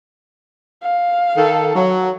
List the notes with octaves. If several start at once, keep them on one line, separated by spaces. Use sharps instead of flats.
F5
D#3 A4
F#3